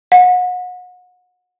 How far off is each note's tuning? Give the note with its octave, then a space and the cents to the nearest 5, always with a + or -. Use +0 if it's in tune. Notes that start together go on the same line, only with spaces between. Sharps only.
F#5 -35